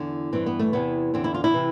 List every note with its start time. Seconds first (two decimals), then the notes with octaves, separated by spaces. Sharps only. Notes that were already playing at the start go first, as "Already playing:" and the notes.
Already playing: E2 D3
0.32 G2 E3 C4
0.46 B3
0.59 A3
0.73 E2 C3 E3 B3
1.14 E2 D3 C4
1.24 E4
1.34 F4
1.44 E4
1.54 C3 E3